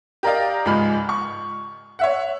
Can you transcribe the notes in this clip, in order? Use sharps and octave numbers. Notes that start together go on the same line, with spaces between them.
G4 A#4 D5 D#5 F5
C#2 G#2 F3 G#3 B5 F6
C#6
C#5 E5 F#5